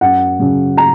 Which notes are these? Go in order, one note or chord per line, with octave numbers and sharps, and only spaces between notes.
F#2 F#5
C#3 F#3
A#5